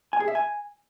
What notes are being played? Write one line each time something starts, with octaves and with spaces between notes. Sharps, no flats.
G#5
G#4
E5
G#5